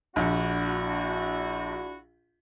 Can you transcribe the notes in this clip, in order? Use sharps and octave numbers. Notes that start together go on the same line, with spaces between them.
A#1 D4 E4 F#4